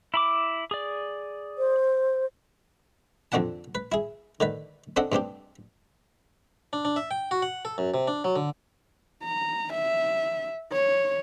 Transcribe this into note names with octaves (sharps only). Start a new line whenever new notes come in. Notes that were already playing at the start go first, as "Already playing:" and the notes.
E4 B5 D6
G#4 D5
C5
F2 D3 C4 D4 F#5 A5
B4
E4 G#4
D3 D#3 B4
C4 D4 A4 D#5 F#5
G2 C4 D4 G4
D4
D4
E5
G5
F#4
F#5
A4
F#2
C3
D4
F#3
D3
A#5
E5
C#5